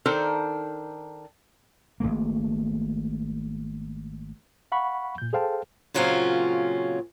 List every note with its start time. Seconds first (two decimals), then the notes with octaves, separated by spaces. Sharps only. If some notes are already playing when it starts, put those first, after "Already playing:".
0.06 D#3 D4 D#4 A4 A#4 C5
2.00 G#1 D#2 A3 A#3
4.72 F5 F#5 B5 C#6
5.18 A#2 G6
5.33 G#4 A4 C5 F5 G5 A5
5.94 A#2 C#3 F#3 C4 C#4 F4